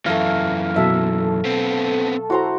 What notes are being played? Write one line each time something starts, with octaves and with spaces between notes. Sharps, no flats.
F#2 E3 A3 F5
B2 F#3 A4 E5
B3 C4
E4 F#4 C5 A#5